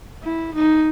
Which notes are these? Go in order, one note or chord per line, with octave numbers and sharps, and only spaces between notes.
E4
D#4